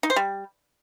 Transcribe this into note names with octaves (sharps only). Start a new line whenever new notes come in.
D#4
C5
G3